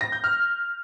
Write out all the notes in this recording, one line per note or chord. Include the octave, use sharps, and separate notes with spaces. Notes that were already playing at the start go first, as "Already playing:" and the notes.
A#6
G6
F6